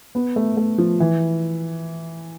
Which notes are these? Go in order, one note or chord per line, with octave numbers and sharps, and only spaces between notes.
B3
A3
A3
F3
E3